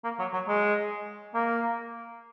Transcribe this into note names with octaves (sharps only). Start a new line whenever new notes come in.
A#3
F#3
F#3
G#3
A#3